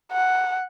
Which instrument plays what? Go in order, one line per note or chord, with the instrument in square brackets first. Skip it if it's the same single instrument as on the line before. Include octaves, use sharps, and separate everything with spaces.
[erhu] F#5